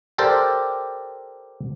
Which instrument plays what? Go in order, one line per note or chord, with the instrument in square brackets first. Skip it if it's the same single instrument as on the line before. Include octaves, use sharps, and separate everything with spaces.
[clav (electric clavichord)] G4 A4 A#4 C5 D5 G5